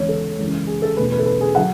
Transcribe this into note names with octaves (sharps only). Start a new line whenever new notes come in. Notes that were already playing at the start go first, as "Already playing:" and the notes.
Already playing: E2 C#3 E3 G#3 C#4 C#5
A4
F#2 C#3 E3 G#3
G#4
A4
E2 B2 A3 C#4 B4
B4
A4
B4
G#4
F#3 F#5